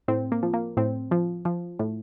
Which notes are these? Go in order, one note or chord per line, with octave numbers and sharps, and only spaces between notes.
A2 C4
A#3
F3
A#3
A2 C4
F3
F3
A2